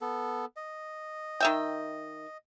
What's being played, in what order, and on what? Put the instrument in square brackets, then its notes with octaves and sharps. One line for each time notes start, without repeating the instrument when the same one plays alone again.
[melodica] B3 A4
D#5
[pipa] D#3 E5 G5